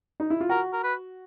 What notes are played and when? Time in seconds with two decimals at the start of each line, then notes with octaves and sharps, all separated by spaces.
0.20 D#4
0.30 E4
0.41 F4
0.49 F#4 A#4
0.73 A#4
0.84 B4